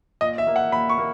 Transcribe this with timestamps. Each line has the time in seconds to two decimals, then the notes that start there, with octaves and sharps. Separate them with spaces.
0.21 A#2 D#5
0.38 E5
0.47 A#3
0.56 F#5
0.72 A#2 B5
0.89 C#6
0.98 A#3